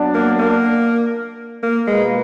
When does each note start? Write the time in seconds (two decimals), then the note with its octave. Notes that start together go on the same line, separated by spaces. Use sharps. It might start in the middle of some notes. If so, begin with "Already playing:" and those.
Already playing: F#3 B3 D4
0.14 A#3
0.39 A#3
1.63 A#3
1.87 B2 G#3 A#3 F4 B4